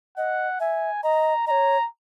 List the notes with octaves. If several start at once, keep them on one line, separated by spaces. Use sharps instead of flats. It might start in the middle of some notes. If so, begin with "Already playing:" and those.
D#5 F#5
E5 G#5
D#5 A#5
C#5 D#5 A#5